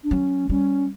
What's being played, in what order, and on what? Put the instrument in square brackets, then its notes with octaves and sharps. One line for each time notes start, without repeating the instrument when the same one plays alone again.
[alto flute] D4
[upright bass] F#3 [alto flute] C#4
[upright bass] G3 [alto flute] C#4